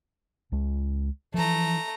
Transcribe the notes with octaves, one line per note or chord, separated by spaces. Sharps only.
C#2 G#3
E3 F3 A3 A#5